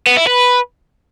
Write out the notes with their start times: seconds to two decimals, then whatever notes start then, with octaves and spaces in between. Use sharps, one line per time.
0.06 B3
0.17 E4
0.27 B4